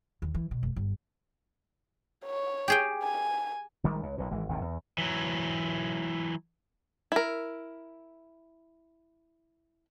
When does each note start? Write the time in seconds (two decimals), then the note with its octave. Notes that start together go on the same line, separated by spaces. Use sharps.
0.22 D#2
0.34 E3
0.51 B2
0.63 F1
0.76 G1
2.25 C#5
2.68 G4 G#4 G5
3.03 G#5
3.84 A#1 D#3 G3 G#3
4.03 C#2
4.18 B1 A#2
4.31 G#1 E3 G#3
4.49 G#1 D#2 A2 C3
4.61 E2
4.98 E3 F#3
7.12 E4 A#4